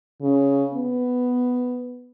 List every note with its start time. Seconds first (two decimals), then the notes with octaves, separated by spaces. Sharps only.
0.22 C#3
0.74 B3